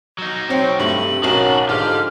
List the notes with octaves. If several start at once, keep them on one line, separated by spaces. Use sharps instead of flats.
F#3 D#4
C4 C#5 G5
G2 C3 A3 F#7
B1 C#4 D#4 F#4 A#4 A5
G#2 D3 F3 G#3 G4 F6